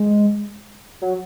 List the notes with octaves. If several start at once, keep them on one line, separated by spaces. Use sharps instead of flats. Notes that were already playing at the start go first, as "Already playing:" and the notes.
Already playing: G#3
F#3